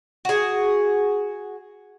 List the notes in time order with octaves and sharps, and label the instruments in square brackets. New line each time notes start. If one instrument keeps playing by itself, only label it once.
[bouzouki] F#4 G#4